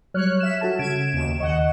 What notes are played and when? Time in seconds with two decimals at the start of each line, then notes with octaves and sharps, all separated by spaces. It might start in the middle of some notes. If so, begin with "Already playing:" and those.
0.14 F#3 G3 C#5 F6 F#6
0.40 E5 E7
0.61 F#4 A4 A5
0.79 C#3 G#6 D7 E7
1.13 D#2 E7
1.40 D#2 D#5 F#5 C#6